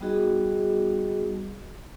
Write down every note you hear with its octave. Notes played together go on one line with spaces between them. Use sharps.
G3 B3 D#4 F#4 G#4 D#5